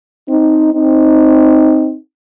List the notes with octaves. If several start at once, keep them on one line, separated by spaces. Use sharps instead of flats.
C4 D#4
C4 D#4